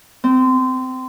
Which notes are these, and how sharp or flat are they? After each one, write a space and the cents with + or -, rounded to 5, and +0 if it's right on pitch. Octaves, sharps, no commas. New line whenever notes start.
C4 -25